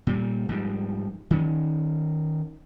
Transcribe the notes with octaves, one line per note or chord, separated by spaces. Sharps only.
A#2 G3
G#2 F3 G3
D#3 C#4